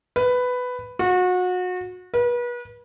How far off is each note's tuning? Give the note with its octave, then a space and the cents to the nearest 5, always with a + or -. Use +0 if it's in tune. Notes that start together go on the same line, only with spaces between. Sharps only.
B4 +10
F#4 -30
B4 -35